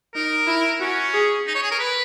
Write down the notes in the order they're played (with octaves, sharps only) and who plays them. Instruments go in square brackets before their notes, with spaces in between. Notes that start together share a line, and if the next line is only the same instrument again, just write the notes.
[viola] D#4 [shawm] A#4
[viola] E4
[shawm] C#4 [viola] F#4
[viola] G#4
[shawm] D#4
C#5
G#4
A#4
B4